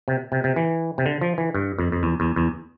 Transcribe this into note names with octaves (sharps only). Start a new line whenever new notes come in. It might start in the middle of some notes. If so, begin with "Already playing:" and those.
C3
C3
C3
E3
C3
D3
F3
E3
G2
F2
F2
E2
E2
E2